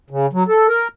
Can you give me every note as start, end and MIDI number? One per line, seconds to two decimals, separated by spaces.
0.10 0.26 49
0.33 0.43 54
0.48 0.67 69
0.68 0.88 70